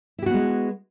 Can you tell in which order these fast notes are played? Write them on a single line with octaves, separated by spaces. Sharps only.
E4 G4 F#4 B3 G#3